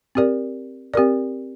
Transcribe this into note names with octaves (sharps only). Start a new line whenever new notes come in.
C4 G4 A#4 D5
C4 G4 A#4 D5